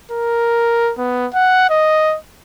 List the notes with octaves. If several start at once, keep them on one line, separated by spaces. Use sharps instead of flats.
A#4
B3
F#5
D#5